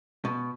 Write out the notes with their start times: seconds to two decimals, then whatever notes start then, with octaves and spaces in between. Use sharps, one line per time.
0.25 B2